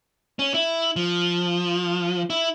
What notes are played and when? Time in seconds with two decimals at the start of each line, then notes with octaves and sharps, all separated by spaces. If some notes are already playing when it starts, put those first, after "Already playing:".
0.39 C#4
0.54 E4
0.96 F3
2.30 E4